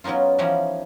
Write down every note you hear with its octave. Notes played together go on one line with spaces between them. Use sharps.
F#3 B3 C#4 D#4 F4
E3 F3 G3 C#4 D#4